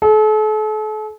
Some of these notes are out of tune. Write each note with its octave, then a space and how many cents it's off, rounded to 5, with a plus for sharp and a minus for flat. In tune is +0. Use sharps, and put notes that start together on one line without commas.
A4 -40